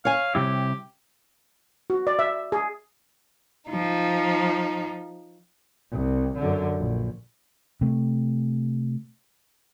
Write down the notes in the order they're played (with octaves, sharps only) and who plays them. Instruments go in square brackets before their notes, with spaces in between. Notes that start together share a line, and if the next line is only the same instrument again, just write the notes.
[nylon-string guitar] C#5 G#5 [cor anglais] F5
[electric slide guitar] C3 G3 E4 [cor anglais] G4
[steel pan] F#4
D5
E5
G#4
[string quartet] F3 D#4
[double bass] C2
F#2 D3
A#1
[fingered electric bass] C3 A3